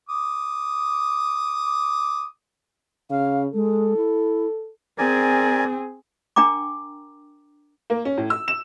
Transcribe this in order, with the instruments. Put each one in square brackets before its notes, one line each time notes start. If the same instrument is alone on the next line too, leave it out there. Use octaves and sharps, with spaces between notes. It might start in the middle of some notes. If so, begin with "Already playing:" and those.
[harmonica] D6 D#6
[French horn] C#3 [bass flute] F5
[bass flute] G#3 [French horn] A4
[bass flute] E4
[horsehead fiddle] C4 G#4 [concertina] A#4 D5 G#5
[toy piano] D4 A#4 G5 A#5 D6
[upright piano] A#3
C#4
A2
E6
E7